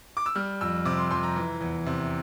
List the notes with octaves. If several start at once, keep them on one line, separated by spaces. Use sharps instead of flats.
D6
E6
G3 F6
F2 E6
C3 D6
C6
F2 C6
A#5
E3
E2
C3